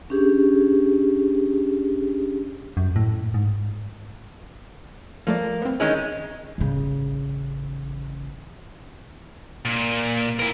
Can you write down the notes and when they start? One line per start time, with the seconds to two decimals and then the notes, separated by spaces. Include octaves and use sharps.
0.10 C#4 D4 G4 G#4
2.77 F#2
2.96 A2
3.34 G#2
5.27 F3 A3 A#3 D5
5.62 B3 C4
5.80 D#3 G#3 C#4 E4
6.58 A1 C#3
9.65 A#2
10.39 E4 A#4